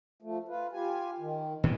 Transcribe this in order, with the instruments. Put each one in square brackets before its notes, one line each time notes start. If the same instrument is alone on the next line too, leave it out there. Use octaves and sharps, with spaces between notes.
[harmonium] F3 A3
F4 B4
F4 G4 G#5
D#3
[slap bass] A#2 D#3 E3